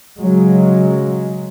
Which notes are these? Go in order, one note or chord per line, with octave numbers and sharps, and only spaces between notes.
C#3 F#3 G#3